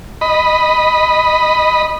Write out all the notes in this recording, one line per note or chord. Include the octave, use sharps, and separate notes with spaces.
D#5 B5